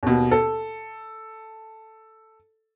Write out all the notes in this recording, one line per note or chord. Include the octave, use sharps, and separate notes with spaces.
D#2 B2
A4